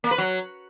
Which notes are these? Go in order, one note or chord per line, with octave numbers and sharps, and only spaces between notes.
A#3
B4
F#3